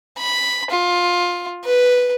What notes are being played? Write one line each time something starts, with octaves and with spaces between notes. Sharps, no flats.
B5
F4
B4